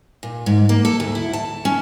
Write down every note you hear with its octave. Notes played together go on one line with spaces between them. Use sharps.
A#2
G#2
A#3
A4
D2
E4
A5
C#4